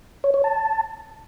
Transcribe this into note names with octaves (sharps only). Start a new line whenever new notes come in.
C#5
C#5
A5